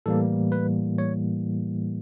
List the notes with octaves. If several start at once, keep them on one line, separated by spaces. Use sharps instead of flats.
A2 E3 G3 A#3 A4
B4
C#5